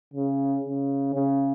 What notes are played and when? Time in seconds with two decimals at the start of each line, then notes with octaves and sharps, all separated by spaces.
0.13 C#3
0.64 C#3
1.14 C#3